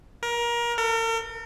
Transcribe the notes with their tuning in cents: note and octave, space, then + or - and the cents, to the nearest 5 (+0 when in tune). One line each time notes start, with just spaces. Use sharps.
A#4 +25
A#4 -45